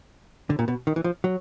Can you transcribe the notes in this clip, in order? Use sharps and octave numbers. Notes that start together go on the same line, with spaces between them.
D3
A#2
B2
D#3
E3
F3
F#3